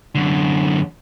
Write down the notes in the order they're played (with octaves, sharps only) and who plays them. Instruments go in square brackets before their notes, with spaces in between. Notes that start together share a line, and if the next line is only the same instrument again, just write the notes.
[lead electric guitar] F#2 D3